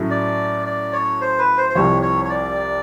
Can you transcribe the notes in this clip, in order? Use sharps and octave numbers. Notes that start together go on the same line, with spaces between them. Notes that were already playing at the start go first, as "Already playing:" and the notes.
Already playing: A2 F#3 A3 C#4 E4
D5
D5
C#5
C5
B4
C5
C5
C2 C3 F3 C#5
C#5
C#5
D5